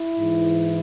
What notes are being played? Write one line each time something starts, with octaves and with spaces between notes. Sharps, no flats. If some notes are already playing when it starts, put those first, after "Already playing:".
Already playing: E4
G#2 E3